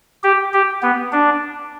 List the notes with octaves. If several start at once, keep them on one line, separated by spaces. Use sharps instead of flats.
G4
G4
B3
D4